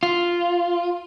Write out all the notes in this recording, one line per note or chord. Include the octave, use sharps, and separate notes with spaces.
F4